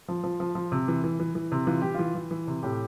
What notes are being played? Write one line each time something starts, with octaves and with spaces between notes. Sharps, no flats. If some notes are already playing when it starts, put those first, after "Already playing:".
F3
F3
F3
F3
C3
E3
E3
E3
E3
C3
E3 F4
E3 G4
E3 F4
E3
E3
C3
A2 G4